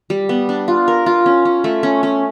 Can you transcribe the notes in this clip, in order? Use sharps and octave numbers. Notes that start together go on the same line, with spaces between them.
G3
B3
D4
F4
A#4
F4
C#4
C#4
A3
C#4
C#4